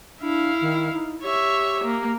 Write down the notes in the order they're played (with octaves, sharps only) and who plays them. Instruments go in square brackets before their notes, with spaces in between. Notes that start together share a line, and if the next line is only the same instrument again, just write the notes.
[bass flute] D4 [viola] E4 F5
[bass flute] D#3
D#4
[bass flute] G4 [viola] C#5 E5
[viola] A#3